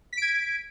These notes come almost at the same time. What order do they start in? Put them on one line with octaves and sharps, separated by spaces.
B6 D7 G#6